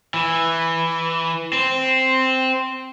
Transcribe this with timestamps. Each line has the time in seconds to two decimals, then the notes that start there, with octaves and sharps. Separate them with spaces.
0.14 E3
1.53 C4